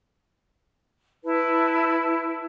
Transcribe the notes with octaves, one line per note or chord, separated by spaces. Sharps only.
E4 B4 A5